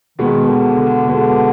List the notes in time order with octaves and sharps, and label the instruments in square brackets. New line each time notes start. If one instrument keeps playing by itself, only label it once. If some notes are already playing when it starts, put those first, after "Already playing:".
[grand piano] B2 G#3 B3 [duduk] D#3
[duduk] D3
D3
[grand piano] B2 G#3 B3 [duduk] D3